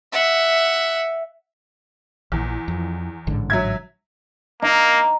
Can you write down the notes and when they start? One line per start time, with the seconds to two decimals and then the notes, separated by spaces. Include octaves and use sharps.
0.13 E5 F#5
2.32 A#1 E2
2.68 F2
3.27 A1 G#2 D3
3.50 F#3 E5 G#6
4.62 A#3 D#4